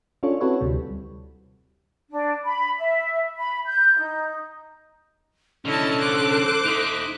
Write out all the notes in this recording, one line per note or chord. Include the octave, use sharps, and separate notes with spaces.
C#4 D4 F4 A4 C#5
C4 E4 F#4 A4 B4 C#5
D2 C3 G3
D4
B5
E5
B5
G6
D#4
D3 C#4 E4 A4 D#5 A5
C5 D6 F#6
D#4 E5